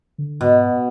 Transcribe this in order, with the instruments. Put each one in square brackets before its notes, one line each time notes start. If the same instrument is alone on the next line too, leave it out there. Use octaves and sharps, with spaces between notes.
[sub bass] D3
[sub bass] G#2 [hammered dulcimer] B2